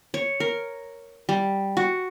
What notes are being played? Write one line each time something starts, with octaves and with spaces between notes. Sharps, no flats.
C#5
A#4
G3
F#4